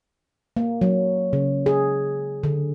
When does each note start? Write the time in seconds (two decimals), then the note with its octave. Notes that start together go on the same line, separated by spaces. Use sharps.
0.57 A#3
0.81 F#3
1.33 C#3
1.66 G#4
2.43 D3